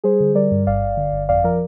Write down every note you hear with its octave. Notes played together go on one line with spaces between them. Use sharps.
G3 G#4 C5
D3
G3 A#4 D5
G2
G1 D5 F5
G1
D3
G1
F2 D5 F5
F3 A#4 D5